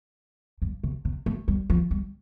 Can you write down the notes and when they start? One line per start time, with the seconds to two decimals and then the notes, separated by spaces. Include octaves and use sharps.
0.62 G2
0.83 C3
1.05 C3
1.26 A3
1.48 G3
1.70 F3
1.91 G3